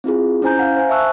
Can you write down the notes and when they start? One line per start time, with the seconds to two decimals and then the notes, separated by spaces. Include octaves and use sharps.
0.04 C4 E4 F4 G#4
0.42 C#4 E4 C5 G#5 A#5 G6
0.57 F5 F#5 A#5
0.76 C5 G#5
0.89 E5 A5 C#6 E6 F#6